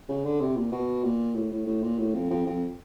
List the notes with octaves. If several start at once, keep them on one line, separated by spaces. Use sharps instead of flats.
C#3
D3
C3
A#2
B2
A#2
A2
A2
A2
A#2
A2
F2
F2
F2